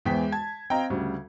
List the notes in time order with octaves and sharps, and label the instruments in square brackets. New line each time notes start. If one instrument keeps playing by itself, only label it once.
[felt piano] E2 E3 C5 [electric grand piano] G#3 G5 B6
[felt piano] A5 [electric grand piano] G#6
[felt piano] C4 D#5 F5 [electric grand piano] G5 A#5
[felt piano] D2 C#3 [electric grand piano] G3